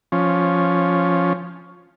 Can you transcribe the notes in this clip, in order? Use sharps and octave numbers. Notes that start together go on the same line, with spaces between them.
F3 C#4